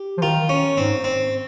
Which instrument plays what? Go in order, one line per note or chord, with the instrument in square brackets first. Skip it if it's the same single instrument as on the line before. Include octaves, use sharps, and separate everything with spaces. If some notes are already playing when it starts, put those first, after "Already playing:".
Already playing: [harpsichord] G4
[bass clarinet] F3
[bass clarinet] D#3 [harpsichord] F4
[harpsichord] C#4
[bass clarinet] G#2 [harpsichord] C4
[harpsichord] C4